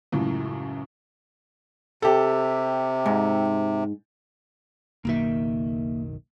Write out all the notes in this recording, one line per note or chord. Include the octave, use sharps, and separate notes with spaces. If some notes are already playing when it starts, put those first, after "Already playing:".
C#2 F#2 A2
C3 G4 A4
G#2
F#1 B1 D#3 A#3 E5